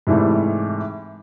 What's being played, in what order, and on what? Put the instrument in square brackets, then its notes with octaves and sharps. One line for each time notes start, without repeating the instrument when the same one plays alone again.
[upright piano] G#2 C3 E3 G3 A3